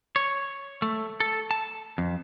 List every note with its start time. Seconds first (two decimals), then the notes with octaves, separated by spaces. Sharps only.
0.16 C#5
0.82 A3
1.20 A4
1.51 A5
1.98 F2